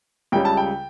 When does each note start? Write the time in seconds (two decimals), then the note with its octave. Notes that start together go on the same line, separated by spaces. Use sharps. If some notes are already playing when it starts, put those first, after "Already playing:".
0.32 C#2 C#3 G3 C#4 G5
0.45 A5
0.57 G5